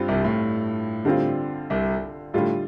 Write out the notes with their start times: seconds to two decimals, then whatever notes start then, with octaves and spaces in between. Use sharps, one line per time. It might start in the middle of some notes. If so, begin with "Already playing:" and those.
Already playing: G2 G3 C4 F4
0.08 C2 C3
0.24 A2
1.05 D3 G3 C4 F4
1.70 C2 C3
2.34 A2 D3 G3 F4